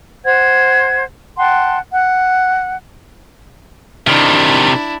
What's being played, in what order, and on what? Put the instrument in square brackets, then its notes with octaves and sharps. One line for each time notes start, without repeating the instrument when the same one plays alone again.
[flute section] C5 F#5 G#6
F#5 G5 A5 C6
F#5
[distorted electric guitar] C3 D#3 [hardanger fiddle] D4 E4